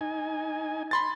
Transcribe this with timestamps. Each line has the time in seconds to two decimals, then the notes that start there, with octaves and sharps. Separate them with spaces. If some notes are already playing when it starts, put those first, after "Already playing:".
0.01 D#4 G#5
0.91 B5 C6 A6